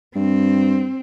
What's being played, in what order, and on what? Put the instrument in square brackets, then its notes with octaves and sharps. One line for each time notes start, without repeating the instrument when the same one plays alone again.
[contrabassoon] G2 [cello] C4